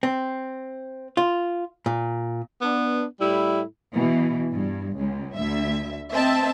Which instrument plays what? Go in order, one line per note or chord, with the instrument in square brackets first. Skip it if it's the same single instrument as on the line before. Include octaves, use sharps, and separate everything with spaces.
[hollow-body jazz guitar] C4
F4
A#2
[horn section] B3 D4
A2 G3 E4
[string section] B2 E3
G2
C#2
D2 E5
C4 D#5 E5 A5